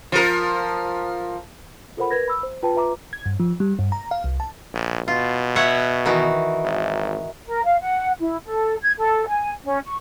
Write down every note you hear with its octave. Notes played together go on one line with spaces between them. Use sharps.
F3 A#4
F4 A4 A#4 C5 F#5 B5
A#4 B4 G#6 A#6
B5 E6
C5
F4 B4 G5 A5
F4 B4 E5 A#5 D6
G#6
G2
F3
G3
G2
A#5
F5
C2
A5
A#1
B2 F4
C#5 E5 F#5
D#3 E3 F#4
G#1
A#4
F5
F#5
E4
A4
G#6
A4
G#5
C#4
C#6